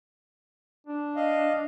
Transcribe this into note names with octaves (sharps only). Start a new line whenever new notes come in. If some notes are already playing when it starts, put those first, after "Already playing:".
D4
D#5 F5